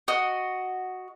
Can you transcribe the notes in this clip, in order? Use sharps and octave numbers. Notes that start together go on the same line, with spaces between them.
F#4 D#5